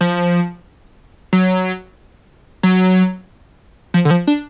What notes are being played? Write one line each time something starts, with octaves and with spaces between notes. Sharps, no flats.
F3
F#3
F#3
F3
D3
F3
D4